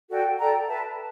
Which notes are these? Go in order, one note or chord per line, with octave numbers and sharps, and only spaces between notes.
F#4 A4 D5 G5
A4 D5 G5 A#5
B4 E5 A5